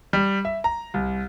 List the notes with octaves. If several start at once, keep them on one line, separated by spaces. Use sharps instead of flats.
G3
E5
A#5
C2